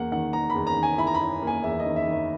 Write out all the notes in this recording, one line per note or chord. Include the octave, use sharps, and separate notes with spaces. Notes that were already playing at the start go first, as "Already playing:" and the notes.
Already playing: E2 A#3 F#5
D#3 F#5
D#3 A#5
B5
E2
A#5
D#3
G#5
E4 B5
A#5
B5
E4
A#3 G#5
E2 E5
D#5
D#3
E5
D#3
E5